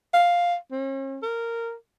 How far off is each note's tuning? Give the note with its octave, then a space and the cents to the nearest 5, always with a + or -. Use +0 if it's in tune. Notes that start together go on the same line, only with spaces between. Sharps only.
F5 +5
C#4 -45
A#4 -15